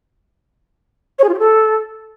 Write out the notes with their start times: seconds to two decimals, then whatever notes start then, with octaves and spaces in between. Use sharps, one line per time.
1.19 C#5
1.24 G#4
1.29 F4
1.34 G4
1.39 A4